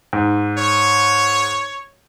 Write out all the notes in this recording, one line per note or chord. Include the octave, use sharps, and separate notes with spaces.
G#2
C#5